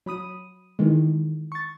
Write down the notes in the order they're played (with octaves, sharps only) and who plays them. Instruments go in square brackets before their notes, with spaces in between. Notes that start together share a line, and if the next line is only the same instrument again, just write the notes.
[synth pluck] F#3 B5 D#6 D#7
D#3 E3 G#3
C#6 A6